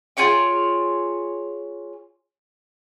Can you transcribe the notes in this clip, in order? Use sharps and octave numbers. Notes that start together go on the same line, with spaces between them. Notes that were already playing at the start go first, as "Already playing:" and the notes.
F4 G#4 C#5 G5